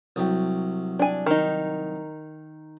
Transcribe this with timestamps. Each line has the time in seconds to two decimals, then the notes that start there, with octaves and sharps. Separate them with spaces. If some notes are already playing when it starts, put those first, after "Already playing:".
0.16 C2 F#3 G4
0.99 D4 G#5
1.26 D#3 D#4